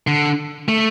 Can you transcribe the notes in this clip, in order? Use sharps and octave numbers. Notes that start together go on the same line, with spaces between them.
D3
A3